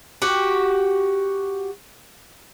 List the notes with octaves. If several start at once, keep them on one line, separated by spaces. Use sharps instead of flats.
F#4 G4